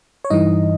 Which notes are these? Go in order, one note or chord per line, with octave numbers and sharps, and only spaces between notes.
C#5
G2 E3 D#4 D#5